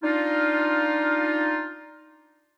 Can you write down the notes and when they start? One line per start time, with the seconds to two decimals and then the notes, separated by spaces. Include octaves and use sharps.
0.04 D4 D#4 F4